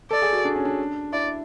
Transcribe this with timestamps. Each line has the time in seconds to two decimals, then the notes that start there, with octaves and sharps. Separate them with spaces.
0.11 A4 D5
0.22 G#4
0.33 F#4
0.45 D4
0.56 C#4
0.65 D4
1.13 E4 D5